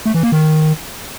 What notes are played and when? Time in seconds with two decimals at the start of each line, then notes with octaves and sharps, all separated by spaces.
0.06 A3
0.14 E3
0.23 A#3
0.32 D#3